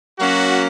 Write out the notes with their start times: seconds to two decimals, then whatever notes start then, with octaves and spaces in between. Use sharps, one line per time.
0.18 F#3 A#3 C#4 F#4